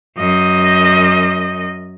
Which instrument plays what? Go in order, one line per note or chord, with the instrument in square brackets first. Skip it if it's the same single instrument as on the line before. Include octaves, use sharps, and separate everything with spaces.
[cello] F#2 D#5